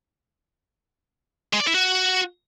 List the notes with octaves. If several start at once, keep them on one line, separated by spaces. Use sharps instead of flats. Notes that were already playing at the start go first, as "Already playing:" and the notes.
G#3
D5
E4
F#4